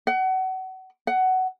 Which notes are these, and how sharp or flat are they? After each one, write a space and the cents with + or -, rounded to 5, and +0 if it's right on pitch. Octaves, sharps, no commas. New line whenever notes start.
F#5 +30
F#5 +15